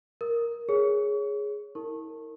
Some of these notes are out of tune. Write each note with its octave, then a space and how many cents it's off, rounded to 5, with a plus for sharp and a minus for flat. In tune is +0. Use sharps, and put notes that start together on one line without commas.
A#4 +0 D#6 +0
G#4 +0 C#5 +0
E4 -40 A#4 -20 C#6 -25